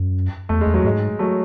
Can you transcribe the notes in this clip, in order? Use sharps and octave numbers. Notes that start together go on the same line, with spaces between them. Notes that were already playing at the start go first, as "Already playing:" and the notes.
Already playing: F#2
E2 A3
G#3
E2
F#3
G#2 G#3
F#3 A3